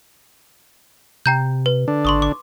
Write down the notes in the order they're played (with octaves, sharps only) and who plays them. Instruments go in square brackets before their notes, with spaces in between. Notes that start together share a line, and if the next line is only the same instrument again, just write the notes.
[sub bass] C3 [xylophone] G5 A#5 G6
[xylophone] B4
[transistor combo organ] D3 D4
[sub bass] G#1 [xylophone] C6 C#6 D#6
[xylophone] D6